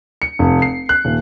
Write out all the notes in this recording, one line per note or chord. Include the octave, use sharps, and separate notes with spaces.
C#7
F1
C7
F#6
D#1